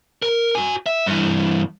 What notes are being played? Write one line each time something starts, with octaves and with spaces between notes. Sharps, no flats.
A#4
F#4 G#5
E5
G2 E3